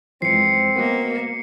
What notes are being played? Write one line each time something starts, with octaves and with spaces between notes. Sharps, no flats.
F#2 E3 F3 G#3 C4 C7 C#7
A#3 B3 F#4 D#5